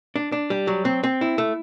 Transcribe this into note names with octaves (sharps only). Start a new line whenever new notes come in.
D4
D4
G3
F#3
C4
C4
E4
A3